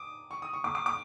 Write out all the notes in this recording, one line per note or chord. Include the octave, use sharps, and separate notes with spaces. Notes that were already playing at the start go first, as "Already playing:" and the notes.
Already playing: D6 D#6
C#6
D#6
C#6
D6
D6
D6